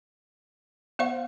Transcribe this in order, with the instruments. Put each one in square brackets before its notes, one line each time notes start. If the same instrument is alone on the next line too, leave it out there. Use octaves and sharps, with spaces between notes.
[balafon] B3 F#5 C#6 [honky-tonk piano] C5 F5